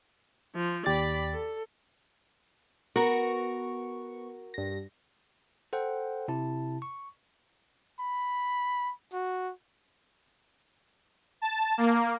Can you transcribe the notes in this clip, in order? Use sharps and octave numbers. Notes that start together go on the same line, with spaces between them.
F3
D#2 G4 D5 B5 A6
A4
B3 F#4 A#4 C#6
G2 A#6
A4 C5 F#5 G5
C3 E4 A5
C#6
B5
F#4
A5
A#3